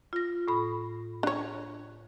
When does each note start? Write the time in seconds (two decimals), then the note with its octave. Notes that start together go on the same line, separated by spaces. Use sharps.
0.13 F4 A#6
0.48 A2 B5
1.23 D4 C#5